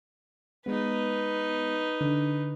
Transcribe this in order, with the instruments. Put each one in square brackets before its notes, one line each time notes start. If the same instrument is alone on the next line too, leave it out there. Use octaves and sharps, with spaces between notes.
[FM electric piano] G#3 B3 [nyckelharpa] D#4 B4
[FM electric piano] D3